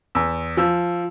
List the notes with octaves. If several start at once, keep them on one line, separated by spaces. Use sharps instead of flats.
E2 E6
F3 E6